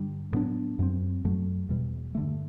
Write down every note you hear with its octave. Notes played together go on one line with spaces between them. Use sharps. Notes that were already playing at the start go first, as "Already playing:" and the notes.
Already playing: G2 D3 G3
A2 F#3 B3 D4
F#2 F#3 C4
F#2 F#3 A3
E2 B2 G3
G2 D3 A3